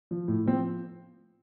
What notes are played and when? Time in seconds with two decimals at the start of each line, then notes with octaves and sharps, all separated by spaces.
0.11 F3
0.28 A2
0.46 F3 C4